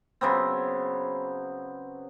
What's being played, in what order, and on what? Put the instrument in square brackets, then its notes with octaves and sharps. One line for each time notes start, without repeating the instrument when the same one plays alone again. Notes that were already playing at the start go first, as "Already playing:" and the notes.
[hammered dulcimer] C#3 F#3 B3 C4